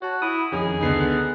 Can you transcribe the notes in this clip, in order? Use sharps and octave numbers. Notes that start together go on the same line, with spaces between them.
F#4 C#5 A5
E4 D#6
F2 D#3 C#4 D#4 G#4
C#2 D3 B3 D#4 C7
F#6